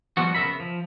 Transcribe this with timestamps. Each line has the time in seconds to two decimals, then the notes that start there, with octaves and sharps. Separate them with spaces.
0.17 F3 G3 B3 F#4
0.35 C#3 B3 A#4 E5 B5
0.60 F3